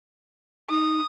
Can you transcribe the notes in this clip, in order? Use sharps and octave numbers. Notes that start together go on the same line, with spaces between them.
D#4 D#6